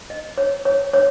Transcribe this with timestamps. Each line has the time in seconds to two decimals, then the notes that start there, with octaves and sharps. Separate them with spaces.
0.10 D#5
0.38 C#5
0.65 C#5
0.94 C#5